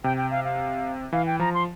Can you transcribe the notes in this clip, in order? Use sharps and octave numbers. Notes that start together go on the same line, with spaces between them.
C3 G5
G5
F5
F5
E3 F5
G5
F3 A#5
C6